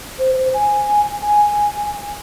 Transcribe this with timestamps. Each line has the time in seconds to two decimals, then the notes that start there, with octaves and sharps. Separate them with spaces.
0.19 C5
0.36 C5
0.54 G#5
1.22 G#5